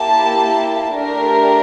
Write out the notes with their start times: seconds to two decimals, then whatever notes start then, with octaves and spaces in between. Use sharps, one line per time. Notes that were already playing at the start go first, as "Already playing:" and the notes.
Already playing: A#3 E4 G4 A5
0.97 A3 D4 G4 A#4